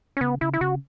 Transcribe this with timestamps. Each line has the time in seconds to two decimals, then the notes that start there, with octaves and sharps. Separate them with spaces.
0.17 C#4
0.21 C#3 B3
0.41 C#3 E4
0.54 E4
0.61 C#3 F#4